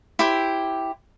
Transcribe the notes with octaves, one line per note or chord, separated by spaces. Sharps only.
E4 G4 C5